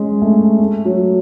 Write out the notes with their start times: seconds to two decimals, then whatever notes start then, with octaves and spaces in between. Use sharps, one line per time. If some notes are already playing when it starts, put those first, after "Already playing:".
Already playing: G#3 C#4
0.22 A3
0.60 A3
0.85 F#3